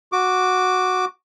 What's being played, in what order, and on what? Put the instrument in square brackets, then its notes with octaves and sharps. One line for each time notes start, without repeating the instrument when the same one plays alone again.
[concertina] F#4 D6